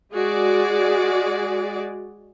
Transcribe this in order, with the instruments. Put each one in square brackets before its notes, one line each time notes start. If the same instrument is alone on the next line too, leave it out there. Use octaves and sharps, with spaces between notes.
[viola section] G#3 F#4 G#4 D5